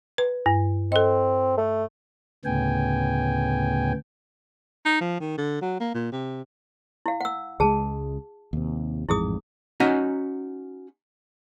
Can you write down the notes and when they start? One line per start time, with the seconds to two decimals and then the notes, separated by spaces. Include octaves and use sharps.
0.18 B4
0.46 G2
0.92 C4 A4 D#5
1.58 A3
2.45 D2 A2 C#3 B3 G5 G#5
4.85 D#4
5.01 F3
5.20 D#3
5.38 D3
5.62 F#3
5.80 A#3
5.94 A#2
6.12 C3
7.06 E4 F5
7.21 F#5 E6
7.60 C#2 F#3 G#3 G#4 A5
8.53 D#2 C3
9.09 A1 F2 G#2 E4 G#4 D#6
9.80 C#4 D#4 F#4 G#5 A#5